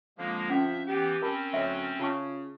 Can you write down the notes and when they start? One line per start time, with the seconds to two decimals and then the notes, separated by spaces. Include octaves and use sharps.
0.18 F2 D3 F3 G#3 A#3
0.50 C#4 E5 F#5
0.87 E3 B3 G4
1.22 C4 C#4 A#4 A5 B5
1.53 D2 F#3 E5
2.00 C#3 F4 A5 C#6